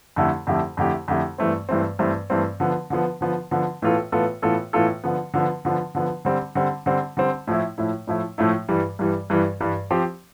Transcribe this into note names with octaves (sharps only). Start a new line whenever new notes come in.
F2 D3 A3 E4 G4
F2 D3 A3 E4 G4
F2 D3 A3 E4 G4
F2 D3 A3 E4 G4
G2 E3 A3 C4
G2 E3 A3 C4
G2 E3 A3 C4
G2 E3 A3 C4
D3 F3 B3
D3 F3 B3
D3 F3 B3
D3 F3 B3
A2 E3 B3 F4 A4
A2 E3 B3 F4 A4
A2 E3 B3 F4 A4
A2 E3 B3 F4 A4
D3 F3 B3
D3 F3 B3
D3 F3 B3
D3 F3 B3
D3 G3 C4
D3 G3 C4
D3 G3 C4
D3 G3 C4
A2 F3 A3 E4
A2 F3 A3 E4
A2 F3 A3 E4
A2 F3 A3 E4
G2 E3 G3
G2 E3 G3
G2 E3 G3
G2 E3 G3
F3 C4 G4